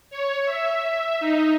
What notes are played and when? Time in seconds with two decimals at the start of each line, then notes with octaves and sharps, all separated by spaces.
0.10 C#5
0.45 E5
1.20 D#4